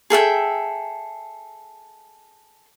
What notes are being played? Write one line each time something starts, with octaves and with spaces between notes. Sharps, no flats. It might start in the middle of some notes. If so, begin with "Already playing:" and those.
G#4 A4 E5 G5